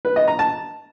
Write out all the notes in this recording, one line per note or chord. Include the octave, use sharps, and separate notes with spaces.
B4
D#5
A#5
A5